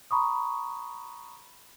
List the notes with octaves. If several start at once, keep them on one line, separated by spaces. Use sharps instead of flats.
A#5 B5 C#6 D#6